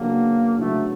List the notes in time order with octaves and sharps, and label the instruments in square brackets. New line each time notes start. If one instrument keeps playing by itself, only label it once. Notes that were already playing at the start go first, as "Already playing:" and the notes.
Already playing: [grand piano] C#3 F#3 B3 D4 [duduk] A#3
[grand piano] C#3 F#3 B3 D4 [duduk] A3